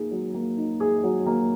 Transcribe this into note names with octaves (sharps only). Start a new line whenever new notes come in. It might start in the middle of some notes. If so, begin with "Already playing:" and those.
Already playing: A#3 D#4 G#4
F#3
A#3
D#4
G#4
F#3
A#3